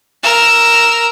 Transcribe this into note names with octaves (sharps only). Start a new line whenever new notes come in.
A#4 E6